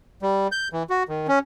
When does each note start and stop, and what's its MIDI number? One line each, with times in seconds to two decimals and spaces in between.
0.22 0.48 55
0.52 0.68 91
0.73 0.83 52
0.90 1.03 66
1.09 1.27 51
1.28 1.39 61